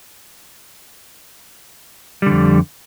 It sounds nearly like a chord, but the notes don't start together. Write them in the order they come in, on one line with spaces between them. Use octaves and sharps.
G3 D3 F2